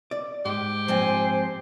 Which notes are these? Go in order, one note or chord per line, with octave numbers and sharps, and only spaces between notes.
D5
G#2 G4
F3 C4 C5 G#5